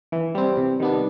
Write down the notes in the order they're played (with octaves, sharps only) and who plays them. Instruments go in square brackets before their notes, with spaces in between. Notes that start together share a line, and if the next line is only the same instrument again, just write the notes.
[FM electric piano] E3
G3 C4
C3
D#3 G3 B3 D4